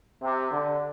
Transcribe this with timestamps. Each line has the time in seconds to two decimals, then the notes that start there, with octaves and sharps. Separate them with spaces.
0.22 C3
0.51 D3